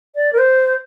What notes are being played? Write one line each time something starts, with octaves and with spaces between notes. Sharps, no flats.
D5
A#4
C5